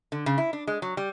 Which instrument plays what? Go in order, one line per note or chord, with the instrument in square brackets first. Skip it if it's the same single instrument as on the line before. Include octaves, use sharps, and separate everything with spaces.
[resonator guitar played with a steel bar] D3
C#3
E4
D4
G#3
F#3
G3